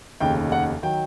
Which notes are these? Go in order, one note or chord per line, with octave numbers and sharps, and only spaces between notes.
F1 D#2 C#3 G5
F#5
D#3 F#3 G5